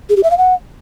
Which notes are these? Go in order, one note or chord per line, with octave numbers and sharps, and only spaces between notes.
G#4
G4
E5
F5
F#5